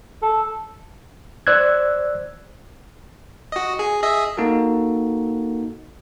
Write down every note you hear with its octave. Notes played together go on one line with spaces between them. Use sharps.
A4
C5 D5 E6 F#6 G#6
F#4 D#5
G#4
G#4 D#5 E5
A#3 D#4 F#4 A4